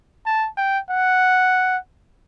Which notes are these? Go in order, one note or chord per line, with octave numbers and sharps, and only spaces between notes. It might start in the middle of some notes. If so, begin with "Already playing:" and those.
A5
G5
F#5